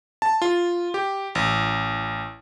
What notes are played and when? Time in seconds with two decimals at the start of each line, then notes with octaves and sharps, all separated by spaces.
0.22 A5
0.42 F4
0.94 G4
1.35 A1